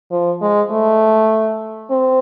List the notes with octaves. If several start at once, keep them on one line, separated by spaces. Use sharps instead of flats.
F3
G#3
A3
C4